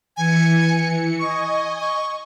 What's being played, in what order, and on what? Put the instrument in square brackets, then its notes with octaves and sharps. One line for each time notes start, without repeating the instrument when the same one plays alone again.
[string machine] E3 C#7 [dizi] G#5
[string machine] D#5 G#5 [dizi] C#6
[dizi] C#6